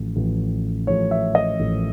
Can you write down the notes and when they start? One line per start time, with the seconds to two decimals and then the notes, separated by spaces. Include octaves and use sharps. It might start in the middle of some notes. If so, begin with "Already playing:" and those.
Already playing: A1 A2 F3
0.16 A1 A2 F3
0.87 A1 A2 F3 C#5
1.11 E5
1.35 D#5
1.59 A1 A2 F3